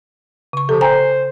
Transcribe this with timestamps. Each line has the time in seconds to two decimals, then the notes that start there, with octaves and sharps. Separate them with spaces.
0.53 C#3 C#6
0.69 C3 F3 A4
0.81 C5 G5 G#5 A#5